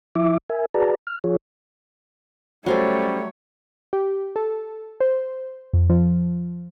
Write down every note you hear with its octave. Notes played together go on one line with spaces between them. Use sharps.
F3 E4 E5 D6
A#4 E5 G#5
F#4 G#4 B4 D5 A5 A#5
F6
F3 F4 G#4 C#5
F#3 G3 A3 C#4 A4 C5 C#5
G4
A4
C5
F2
F3